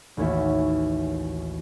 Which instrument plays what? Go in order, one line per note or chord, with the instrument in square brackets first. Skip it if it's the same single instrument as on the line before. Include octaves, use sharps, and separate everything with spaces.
[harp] A1 D#2 C#4 F#4 E5